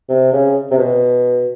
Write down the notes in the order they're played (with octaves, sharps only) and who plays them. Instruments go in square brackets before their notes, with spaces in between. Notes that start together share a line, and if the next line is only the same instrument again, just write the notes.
[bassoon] C3
C#3
C3
B2